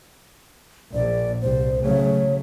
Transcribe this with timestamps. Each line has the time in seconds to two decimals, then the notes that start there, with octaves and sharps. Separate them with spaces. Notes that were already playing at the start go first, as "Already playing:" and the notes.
0.94 A#1 D5
1.41 C2 C5
1.83 C#3 F#3 A3 C#5